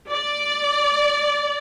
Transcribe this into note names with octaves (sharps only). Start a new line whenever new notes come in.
D5